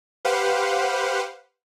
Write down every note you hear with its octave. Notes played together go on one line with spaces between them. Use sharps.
G4 B4 C5 F5 F#5